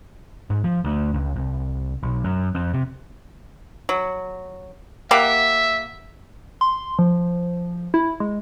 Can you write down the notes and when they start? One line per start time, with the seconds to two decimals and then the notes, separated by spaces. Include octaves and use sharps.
0.50 G#2
0.64 F3
0.84 D2
1.14 C#2
1.36 C2
2.03 B1
2.24 F#2
2.55 F2
2.73 C3
3.89 F#3
5.11 A#3 G4 E5 F#5
6.61 C6
6.99 F3
7.94 E4
8.20 G#3